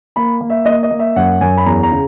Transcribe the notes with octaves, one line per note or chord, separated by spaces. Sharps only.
A#3 B5
A#3
E5
A#3 D#5
D#5
A#3
E5
F#2 F#5
F#2 G#5
B5
E2 A#5
A#5
C#3